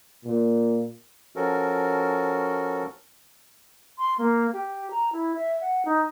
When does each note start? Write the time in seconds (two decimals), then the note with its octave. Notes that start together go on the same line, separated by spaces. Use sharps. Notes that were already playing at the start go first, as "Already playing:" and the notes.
0.24 A#2
1.36 F3 C#4 F#4 A4 A#4
3.98 C6
4.18 A#3
4.53 G4
4.91 A#5
5.13 E4
5.35 E5
5.61 F#5
5.85 D#4